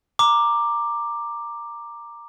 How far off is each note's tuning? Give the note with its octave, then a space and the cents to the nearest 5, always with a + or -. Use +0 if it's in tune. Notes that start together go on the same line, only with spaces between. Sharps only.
A#5 +0 D6 +10